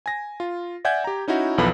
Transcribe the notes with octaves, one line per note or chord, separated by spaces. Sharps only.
G#5 A#6
F4
D5 E5 F#5 G#5 G6 G#6
G4 A#5
C#4 D#4 E4 F#4
B1 E2 F3 A4 B4 B5